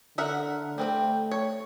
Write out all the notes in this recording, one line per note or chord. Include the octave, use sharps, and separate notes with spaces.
D3 A#4 E5 F#5
G3 A3 C4 G5
C#5